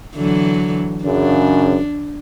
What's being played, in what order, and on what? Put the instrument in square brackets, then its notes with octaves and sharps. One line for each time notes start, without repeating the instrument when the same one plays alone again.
[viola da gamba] D3 E3 F#3
[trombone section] F#2 C#3 [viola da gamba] D4